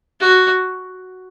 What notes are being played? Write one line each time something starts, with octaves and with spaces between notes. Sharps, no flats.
F#4